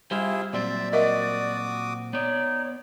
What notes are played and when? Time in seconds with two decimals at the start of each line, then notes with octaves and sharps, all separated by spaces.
0.11 G3 E4 F4 G4 G#4 C5 E5
0.53 A#2 F#3 C4 C5 D5 E5
0.93 F#4 A#4 D#5 E5 D6 D#6
2.13 B3 D#4 C#5 D5